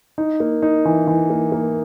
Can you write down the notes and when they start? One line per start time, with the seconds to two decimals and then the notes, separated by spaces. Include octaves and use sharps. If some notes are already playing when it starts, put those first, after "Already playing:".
0.18 D#4
0.40 A#3
0.62 D#4
0.85 E3
1.07 E3
1.30 A#3
1.52 A#3